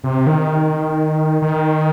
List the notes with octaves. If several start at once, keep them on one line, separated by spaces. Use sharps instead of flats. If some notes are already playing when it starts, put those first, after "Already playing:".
C3
D#3
D#3